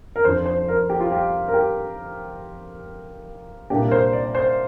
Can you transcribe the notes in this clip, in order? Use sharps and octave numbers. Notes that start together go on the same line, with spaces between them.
A#4
F1 F2 F3 D4 C5
C5
A#4
G4
F4
G4
A#4
G4
C2 A#2 A#3 D4 G4
A#4
C5
D5
C5